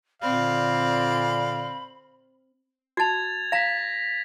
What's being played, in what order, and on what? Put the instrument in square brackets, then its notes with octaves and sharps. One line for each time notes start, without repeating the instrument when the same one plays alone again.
[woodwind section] A#2 D3 D5 [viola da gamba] C4 [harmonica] F5 [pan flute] B5
[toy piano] F#4 A5 [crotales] G#6 A6 F7
[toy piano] F5 A#5 [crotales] A#6 B6